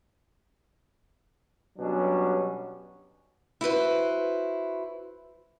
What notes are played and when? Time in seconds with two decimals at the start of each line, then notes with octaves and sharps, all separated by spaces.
1.78 B2 F#3 G3 C#4 D4
3.61 E4 F#4 B4 C5